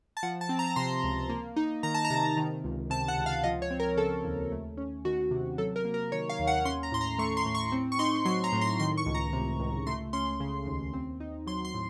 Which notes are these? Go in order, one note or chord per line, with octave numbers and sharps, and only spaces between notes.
A5
F3 F#5
A5
C4
A#5
C3 C6
C#2
A#3
D#4
D#3 A#5
A5
A#5
C3
D#3
C#2
C3 A5
F#5
C#2
F5
F3 D#5
C#5
C4
A#4
C#3 A4
D#2
A3
C#4
D#3 F#4
C3
F#3 A4
A#4
A#3
A#4
D#3 C#5
F5
D#2
F#5
C#4 C6
A#5
A2 C6
A#5
A3 C#6
C6
A2
C#6
C4
C#6
D#4 C6
F#3 C6
A#5
A2
C6
D#3 C6
C#6
C#2
A#5
C3
C#2
A3 C6
C#4 C6
C#3
D#2
C4
D#4
F#3 C6
C6
A2